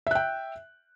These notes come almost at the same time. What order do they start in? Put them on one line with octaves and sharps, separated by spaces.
E5 F#6 G5